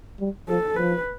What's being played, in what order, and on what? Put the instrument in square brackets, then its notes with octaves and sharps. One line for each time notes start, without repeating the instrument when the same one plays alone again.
[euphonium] G3
[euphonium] F3 [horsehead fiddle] A4
[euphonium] F3 [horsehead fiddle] B4